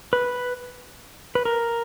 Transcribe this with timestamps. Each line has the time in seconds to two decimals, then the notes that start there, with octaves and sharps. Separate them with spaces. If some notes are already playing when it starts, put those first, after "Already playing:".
0.13 B4
1.35 B4
1.45 A#4